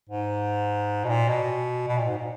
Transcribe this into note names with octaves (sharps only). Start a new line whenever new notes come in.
G#2
B2
A#2
B2
B2
A#2
G#2
A#2